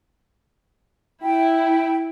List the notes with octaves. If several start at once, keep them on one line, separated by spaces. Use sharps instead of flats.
E4 G5